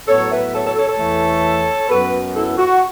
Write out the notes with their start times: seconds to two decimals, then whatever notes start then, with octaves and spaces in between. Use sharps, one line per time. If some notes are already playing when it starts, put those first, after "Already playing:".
0.08 A2 F#3 B3 A4 C#5
0.31 B4 E5
0.53 A4 C#5
0.64 A4 C#5
0.76 A4 C#5
0.87 A4 C#5
0.99 E2 E3 A3
1.89 F#2 F#3 B3 F#4 B4
2.34 E4 A4
2.57 F#4